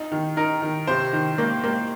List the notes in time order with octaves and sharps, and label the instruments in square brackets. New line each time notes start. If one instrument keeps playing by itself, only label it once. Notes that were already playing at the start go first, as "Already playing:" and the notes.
Already playing: [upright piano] D#4
D#3
[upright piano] D#4 [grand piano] A#4
[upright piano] D#3
[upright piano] C3 [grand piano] C5
[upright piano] D#3
A#3
A#3